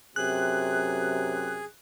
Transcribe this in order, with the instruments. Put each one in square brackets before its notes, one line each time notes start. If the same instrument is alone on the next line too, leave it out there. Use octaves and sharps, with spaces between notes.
[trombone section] F#2 C3 [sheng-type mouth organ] G#4 [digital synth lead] F#6